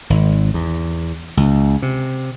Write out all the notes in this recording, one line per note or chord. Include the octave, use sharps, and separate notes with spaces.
G#1
E2
C#2
C3